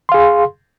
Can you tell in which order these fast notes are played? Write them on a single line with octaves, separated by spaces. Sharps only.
C6 F5 G#4